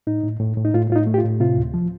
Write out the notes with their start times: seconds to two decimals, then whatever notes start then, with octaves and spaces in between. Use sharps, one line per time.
0.07 A2 D#4
0.23 A2
0.40 A2
0.57 A2
0.65 D#4
0.74 A2 F4
0.90 A2 F4
0.96 D#4
1.07 A3
1.14 G4
1.18 F4
1.24 A2
1.40 C3 F4
1.57 D2
1.74 F3